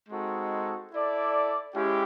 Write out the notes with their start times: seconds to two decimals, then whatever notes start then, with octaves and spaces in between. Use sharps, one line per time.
0.09 G#3 C4 D#4 F#4 A4
0.92 E4 A4 D5
1.75 G#3 C#4 E4 G4